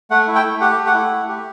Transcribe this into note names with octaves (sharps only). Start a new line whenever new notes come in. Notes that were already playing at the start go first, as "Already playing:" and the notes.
A3 F#5
E4
G5
A3
G4 F#5
A3
F#5
E4
A3
G4